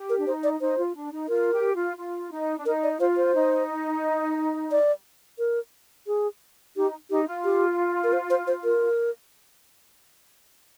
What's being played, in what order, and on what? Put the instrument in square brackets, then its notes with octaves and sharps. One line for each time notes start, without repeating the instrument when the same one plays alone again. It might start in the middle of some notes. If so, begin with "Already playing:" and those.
Already playing: [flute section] G4
[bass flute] A#4
[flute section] D4
[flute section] D#4 [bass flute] C5
[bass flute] D5
[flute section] D#4 [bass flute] C5
[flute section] F4
D4
D#4
[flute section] F4 [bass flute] A#4
[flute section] G4
F4
F4
D#4
D4
[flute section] D#4 [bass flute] A#4
[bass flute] D5
[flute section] F4 [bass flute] C5
[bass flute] C5
[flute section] D#4
[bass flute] D5
A#4
G#4
[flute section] D#4 [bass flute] G4
[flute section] D#4 [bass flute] G4
[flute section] F4
[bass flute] G4
A#4
C5
C5
C5
A#4